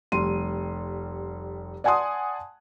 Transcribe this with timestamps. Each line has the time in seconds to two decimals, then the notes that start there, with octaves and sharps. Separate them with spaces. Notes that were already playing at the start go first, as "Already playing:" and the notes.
0.12 F1 G3 C6 D#7
1.84 D5 F#5 G#5 A5 C6 D#6